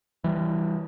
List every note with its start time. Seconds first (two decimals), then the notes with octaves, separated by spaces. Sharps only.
0.24 E3 G3